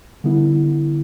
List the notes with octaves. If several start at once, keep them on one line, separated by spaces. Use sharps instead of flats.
D3 G3 B3 E4